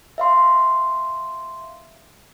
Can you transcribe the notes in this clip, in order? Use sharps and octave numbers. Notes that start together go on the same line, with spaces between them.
E5 F5 C6